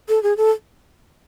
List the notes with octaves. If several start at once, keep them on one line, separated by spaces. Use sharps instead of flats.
A4
G#4
A4